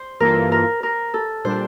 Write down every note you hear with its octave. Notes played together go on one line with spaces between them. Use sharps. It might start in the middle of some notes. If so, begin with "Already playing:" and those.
Already playing: C5
G2 E3 A#3 F4 A4 A#4
A#4
A#4
A4
A#2 G3 D4 C5